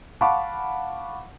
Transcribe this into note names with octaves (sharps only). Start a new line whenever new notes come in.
F5 F#5 A5 B5 C#6 D6